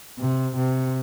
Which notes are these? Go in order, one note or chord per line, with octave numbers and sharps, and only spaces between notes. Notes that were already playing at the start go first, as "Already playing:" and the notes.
C3
C3